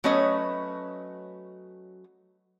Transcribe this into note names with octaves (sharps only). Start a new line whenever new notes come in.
F#3 A3 C#4 B4 D#5